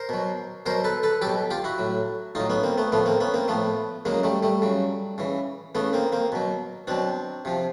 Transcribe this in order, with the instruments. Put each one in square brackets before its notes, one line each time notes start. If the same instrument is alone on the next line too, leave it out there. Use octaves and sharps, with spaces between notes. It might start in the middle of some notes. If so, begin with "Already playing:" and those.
Already playing: [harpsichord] A#4 C5
B2 F#3
B2 F#3 A#4 C5
A4 B4
A4 B4
B2 F#3 G4 A4
F4 G4
E4 F#4
A2 F#3
A2 F#3 D#4 F4
B3 C#4
A#3 C4
A3 B3
A2 F3 A3 B3
A#3 C4
B3 C#4
A#3 C4
A2 F3 A3 B3
C#3 F#3 G#3 A#3
G3 A3
G3 A3
C#3 F#3
C#3 E3
C#3 E3 A3 B3
A#3 C4
A#3 C4
B2 F#3
B2 F#3 C4 D4
C3 F3